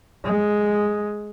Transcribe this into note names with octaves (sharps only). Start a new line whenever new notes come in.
G#3